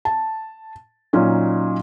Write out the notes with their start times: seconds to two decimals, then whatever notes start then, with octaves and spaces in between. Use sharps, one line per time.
0.05 A5
1.13 A#2 F#3 C#4 D#4